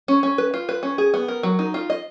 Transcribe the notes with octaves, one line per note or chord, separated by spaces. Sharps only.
C#4
C#4
B4
F4
B4
C#4
G#4
B3
A#4
F#3
D#4
F4
D#5